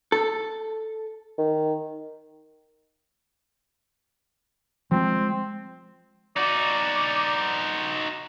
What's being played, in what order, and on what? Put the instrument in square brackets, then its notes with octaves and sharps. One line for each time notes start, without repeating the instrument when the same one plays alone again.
[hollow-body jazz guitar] A4
[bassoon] D#3
[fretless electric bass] F3 G#3 [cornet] C4
[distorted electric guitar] D#4 F#4 [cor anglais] D5